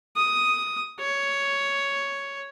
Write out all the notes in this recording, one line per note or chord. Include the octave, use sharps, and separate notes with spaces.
D#6
C#5